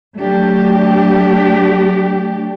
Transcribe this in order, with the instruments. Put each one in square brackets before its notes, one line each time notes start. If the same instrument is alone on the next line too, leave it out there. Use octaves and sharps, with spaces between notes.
[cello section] F#3 A3 D4 G4